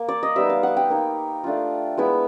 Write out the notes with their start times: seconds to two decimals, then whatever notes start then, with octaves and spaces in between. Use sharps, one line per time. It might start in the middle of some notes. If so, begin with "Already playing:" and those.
Already playing: A#3
0.09 D5
0.23 D#5
0.36 G3 B3 D#4 E5
0.50 F5
0.63 F#5
0.77 G5
0.90 A#3 D#4
1.44 A3 D4 F4
1.97 G#3 B3 E4